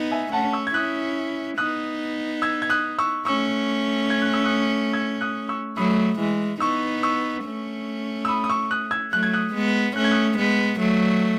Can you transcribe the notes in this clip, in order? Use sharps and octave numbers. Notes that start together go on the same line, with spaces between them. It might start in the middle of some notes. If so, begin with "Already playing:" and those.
Already playing: B3 D#4
E5 G#5
A3 C#4 F#5 A5
C#6 E6
G#6
C#4 E4 D#6 F#6
B3 D#4 D#6 F#6
E6 G#6
G#6
D#6 F#6
C#6 E6
A3 C#4 C#6 E6
G#6
F#6
E6
D#6 F#6
E6 G#6
D#6 F#6
C#6 E6
F#3 A3 B5 D#6
E3 G#3
B3 D#4 C#6 E6
C#6 E6
A3 C#4
E6
B5 D#6
D#6
C#6 E6
D#6 F#6
E6 G#6
F#3 A3 F#6
G#6
D#6 F#6
G#3 B3
A3 C#4 F#6
G#6
D#6 F#6
G#3 B3
F#3 A3